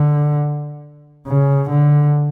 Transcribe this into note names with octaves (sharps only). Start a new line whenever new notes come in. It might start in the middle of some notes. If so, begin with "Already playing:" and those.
Already playing: D3
C#3
D3